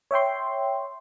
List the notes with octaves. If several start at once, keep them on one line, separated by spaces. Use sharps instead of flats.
C#5 E5 G5 C6